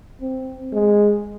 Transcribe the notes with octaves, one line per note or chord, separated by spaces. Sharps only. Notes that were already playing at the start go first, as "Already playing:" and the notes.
C4
G#3